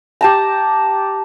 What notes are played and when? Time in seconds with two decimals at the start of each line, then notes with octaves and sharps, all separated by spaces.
0.21 G4 A5 A#5